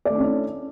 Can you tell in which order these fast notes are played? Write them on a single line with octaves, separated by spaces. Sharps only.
D5 A3 D4 C#4 E4